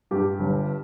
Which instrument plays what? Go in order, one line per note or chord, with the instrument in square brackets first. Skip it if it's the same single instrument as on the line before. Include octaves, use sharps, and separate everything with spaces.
[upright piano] G2 G4
G1